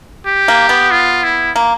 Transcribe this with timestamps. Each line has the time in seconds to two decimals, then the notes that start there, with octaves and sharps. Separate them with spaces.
0.26 G4
0.48 A#3
0.69 B3
0.91 F4
1.23 E4
1.56 A#3